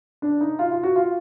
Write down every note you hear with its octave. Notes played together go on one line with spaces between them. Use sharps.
D4
D#4
F4
F4
F#4
F4